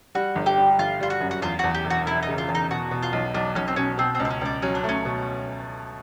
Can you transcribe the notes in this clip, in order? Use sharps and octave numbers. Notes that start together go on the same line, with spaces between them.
G3 F#4
G1
G4
G3
G1 F4
G3 F4
F#4
F#2
F#4
E2 F4
E2 F#4
G4
E1
F#4
E1 E4
D#4
C#3
F4
E2
D#4
B2 F#4
B2
F4
B1
B1 D4
B1 C#4
C4
B2 C#4
B2 C4
C4
C#2
C4
C#4
C#2 D4
F#3 C#4
D4
A3 C#4
B2